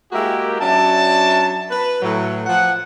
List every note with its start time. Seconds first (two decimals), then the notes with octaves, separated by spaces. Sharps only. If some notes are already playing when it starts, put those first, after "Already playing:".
0.12 G#3 A#3 E4 F#4 G4 A#4
0.60 F#3 C#4 D4 E5 A5
1.69 B4
2.01 A2 F#3
2.46 F3 F#5